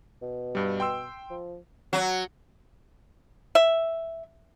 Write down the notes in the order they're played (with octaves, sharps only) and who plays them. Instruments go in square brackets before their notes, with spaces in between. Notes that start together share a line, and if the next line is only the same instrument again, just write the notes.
[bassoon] B2
[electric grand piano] G2 G3
G5 C6 E6
[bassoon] F3
[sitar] F#3
[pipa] E5